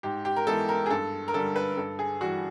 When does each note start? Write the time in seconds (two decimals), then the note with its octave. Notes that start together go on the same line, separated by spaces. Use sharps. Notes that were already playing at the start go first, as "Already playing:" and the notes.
0.03 G#2 G4
0.25 G4
0.36 A#4
0.47 E3 G#3 B3 E4 A4
0.69 A#4
0.86 G#4
0.90 G2 A4
1.28 A#4
1.34 D3 G3 A4
1.56 B4
1.77 G2 A4
1.99 G#4
2.21 E3 G3 F#4